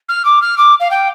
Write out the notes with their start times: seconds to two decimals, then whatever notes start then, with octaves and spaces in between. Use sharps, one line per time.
0.09 F6
0.25 D6
0.42 F6
0.57 D6
0.80 F5
0.91 G5